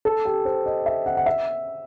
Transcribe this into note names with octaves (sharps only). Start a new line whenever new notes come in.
A4
G4
C5
D#5
E5
F#5
F#5
E5